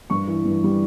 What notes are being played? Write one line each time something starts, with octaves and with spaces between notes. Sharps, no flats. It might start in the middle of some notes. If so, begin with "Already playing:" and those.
G2 C#6
E3
G2
G3